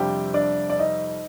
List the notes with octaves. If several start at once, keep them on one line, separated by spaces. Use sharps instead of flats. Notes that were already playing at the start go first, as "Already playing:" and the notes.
Already playing: F2 C3 G3 D4 G4 G5
D4 D5
D5
D#4 D#5